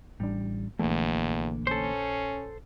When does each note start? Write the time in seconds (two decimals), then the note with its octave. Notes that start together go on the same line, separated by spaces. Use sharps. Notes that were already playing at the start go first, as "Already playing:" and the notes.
0.20 A1 G3 D4
0.79 A#1 E2 D3 E3 A3 A#3
1.67 C#4 A4 C5